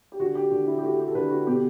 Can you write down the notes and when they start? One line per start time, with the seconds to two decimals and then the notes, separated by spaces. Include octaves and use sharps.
0.12 G4
0.20 D3 F#4
0.35 G4
0.51 D3 F#4
0.67 E4
0.79 G4
0.84 A3 F#4
0.99 G4
1.08 A4
1.15 D3 B4
1.31 F#4
1.47 B2 G4